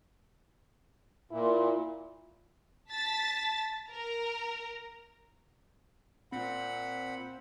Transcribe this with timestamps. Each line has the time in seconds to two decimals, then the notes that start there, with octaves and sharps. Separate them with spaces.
1.31 A#2 E4
2.91 A5 A6 B6
3.89 A#4 A#5
6.32 A#2 C4 F#5 B5